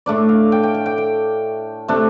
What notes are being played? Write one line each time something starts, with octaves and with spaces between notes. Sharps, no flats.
A2 A3 D4 D5
F5
G5
G5
G5
G5
G5
C3 A3 D4